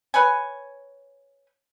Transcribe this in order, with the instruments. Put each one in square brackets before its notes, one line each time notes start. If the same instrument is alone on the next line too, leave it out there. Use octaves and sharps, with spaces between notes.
[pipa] B4 C#5 G#5